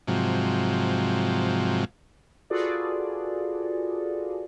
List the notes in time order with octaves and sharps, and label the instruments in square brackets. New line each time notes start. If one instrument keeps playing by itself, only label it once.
[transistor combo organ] G#2 C3 F3 F#3
[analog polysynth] F4 F#4 G#4 A4 B4 D5